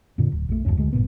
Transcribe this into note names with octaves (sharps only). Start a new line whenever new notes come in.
F2 A#2 D3
D1
A#1 F2 A3
D#1 C2 F#2 C#4
D2 G#3
G1 F2 A#2 B3